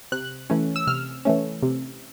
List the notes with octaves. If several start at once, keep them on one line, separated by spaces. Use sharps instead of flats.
C3 F#6
E3 A3 C#4
E6
C3 F6
E3 A3 C#4
C3